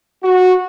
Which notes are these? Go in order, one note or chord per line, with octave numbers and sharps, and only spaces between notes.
F#4